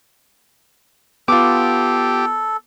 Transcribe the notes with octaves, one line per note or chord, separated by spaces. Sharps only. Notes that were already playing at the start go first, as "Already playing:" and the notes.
B3 F4 G4 A4 D6